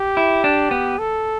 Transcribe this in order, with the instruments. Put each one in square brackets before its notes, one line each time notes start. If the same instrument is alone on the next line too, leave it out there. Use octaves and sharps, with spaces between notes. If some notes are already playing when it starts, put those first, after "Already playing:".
Already playing: [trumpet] G4
[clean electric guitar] E4
D4
B3
[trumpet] A4